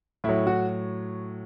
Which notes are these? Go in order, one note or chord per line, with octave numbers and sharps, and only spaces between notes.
A2 F#3 E4
F#4